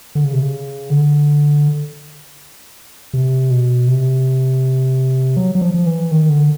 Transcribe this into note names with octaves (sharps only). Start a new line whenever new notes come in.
D3
C#3
C3
C#3
D3
C3
B2
C3
F#3
F#3
F3
F3
E3
D#3
D3